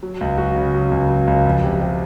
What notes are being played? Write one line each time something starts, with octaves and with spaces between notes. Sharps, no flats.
F#3
C#2
F#3 F#4
C#3
F#3
C#2
F#3
C#2
F2
C3
C3